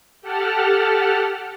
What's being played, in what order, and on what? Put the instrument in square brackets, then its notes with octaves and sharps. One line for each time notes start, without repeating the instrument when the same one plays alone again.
[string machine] G4 A4 F#5 A5 F6